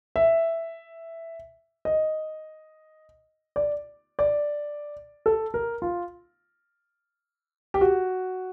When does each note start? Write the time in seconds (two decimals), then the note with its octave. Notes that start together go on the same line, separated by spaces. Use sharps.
0.16 E5
1.85 D#5
3.56 D5
4.19 D5
5.26 A4
5.54 A#4
5.82 F4
7.74 G4
7.81 F#4